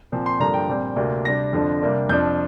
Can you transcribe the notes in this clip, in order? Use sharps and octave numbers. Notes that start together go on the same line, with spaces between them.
A#2 F3 C4
C6
G2 D3 F3 A#3 D4 A#5
G5
A#2 G3 C4
D2 C3 A#3 D4
C3 G3 D4 A#6
F2 D3 F3 D4
C3 G3 A#3 D4
F2 F3 D4 G6